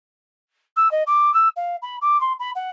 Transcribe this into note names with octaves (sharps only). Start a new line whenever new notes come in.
E6
D#5
D6
E6
F5
B5
D6
C6
B5
F#5